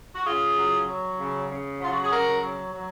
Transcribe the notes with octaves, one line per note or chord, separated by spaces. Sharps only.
F#4
C#3 F4 G#4
F#3
F#3
C#3
C#3
F#3 F4
F#4
G#4
C#3 F#4 A#4
F#3
F#3